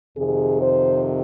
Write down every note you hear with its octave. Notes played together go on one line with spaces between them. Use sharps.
F2 C3 D#3 G#4
C5